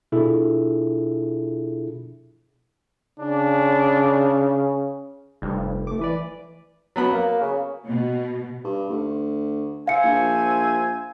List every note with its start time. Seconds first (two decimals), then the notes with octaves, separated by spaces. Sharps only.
0.12 B2 D4 E4 F4 G#4 A4
3.20 C#3 D4
5.42 F1 G2 G3
5.87 A3 D6
5.99 E3 B4 D5
6.96 F#3 B3 B5
7.13 A#3
7.41 C#3
7.87 B2
8.64 G2
8.89 D2
9.87 C5 E5 F5 G#5 C#7
10.03 A#1